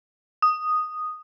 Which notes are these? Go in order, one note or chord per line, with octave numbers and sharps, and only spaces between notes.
D#6